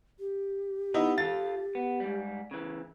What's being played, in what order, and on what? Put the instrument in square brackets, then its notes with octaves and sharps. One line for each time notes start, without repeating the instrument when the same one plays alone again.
[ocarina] G4
[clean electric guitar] B3 [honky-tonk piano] D#4 E4
[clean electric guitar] F4 A4 [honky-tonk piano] A6
[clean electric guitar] B3
G#2 G3
C#3 E3